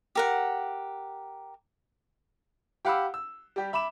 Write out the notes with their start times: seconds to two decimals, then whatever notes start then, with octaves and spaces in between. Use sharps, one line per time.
0.15 G4 A#4 F#5
2.85 G4 F5 F#5 B5 D6 E6
3.14 E6
3.56 G3 G4
3.73 E5 B5 D6 E7